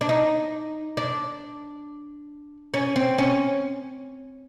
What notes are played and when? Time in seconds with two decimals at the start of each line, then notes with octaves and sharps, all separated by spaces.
0.01 D4
0.09 D#4
0.97 D4
2.74 C#4
2.96 C4
3.18 C#4